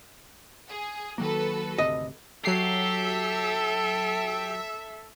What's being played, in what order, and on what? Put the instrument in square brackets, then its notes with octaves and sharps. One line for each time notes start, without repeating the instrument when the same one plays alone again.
[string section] G#4
[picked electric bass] D#3 F#3 A#3 [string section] F#4 A4 B4
[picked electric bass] G#1 D2 C3 [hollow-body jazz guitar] D#5
[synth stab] F#3 C7 [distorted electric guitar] G4 [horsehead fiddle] A4 [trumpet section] E5